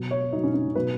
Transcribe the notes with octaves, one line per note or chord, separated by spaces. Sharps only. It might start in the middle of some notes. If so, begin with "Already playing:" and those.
Already playing: B2 F#3
C#5
B2 F#3 D#4
C#4
C#4
B2 F#3 B4